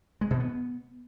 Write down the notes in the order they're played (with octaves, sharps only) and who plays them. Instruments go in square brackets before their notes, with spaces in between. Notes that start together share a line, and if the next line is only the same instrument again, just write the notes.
[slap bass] G#3
B2
B3